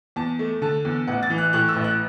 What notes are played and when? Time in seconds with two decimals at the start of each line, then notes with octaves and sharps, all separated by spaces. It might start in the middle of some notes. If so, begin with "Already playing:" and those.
0.16 E2 A5
0.39 A3
0.62 D3 A5
0.85 E2
1.07 A1 F#5
1.23 A6
1.30 E3
1.38 F#6
1.53 A2 F#6
1.69 E6
1.76 A1
1.84 F#6